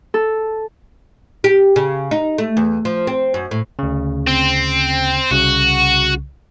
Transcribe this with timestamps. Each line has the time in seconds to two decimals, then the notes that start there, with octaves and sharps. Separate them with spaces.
0.14 A4
1.44 G4
1.76 C#3
2.11 D#4
2.38 A3
2.57 E2
2.85 F3
3.07 C4
3.34 F#2
3.51 A2
3.79 D2 C#3
4.27 C4
5.31 C2 C#3 F#4